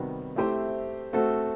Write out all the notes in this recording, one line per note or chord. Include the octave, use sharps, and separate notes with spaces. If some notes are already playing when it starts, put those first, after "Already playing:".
Already playing: C3 D#3 G3 B3 F#4
A3 C4 E4 G4 C5
A3 C4 F#4 A4